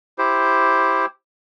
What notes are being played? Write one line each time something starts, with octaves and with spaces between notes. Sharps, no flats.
E4 G4 C5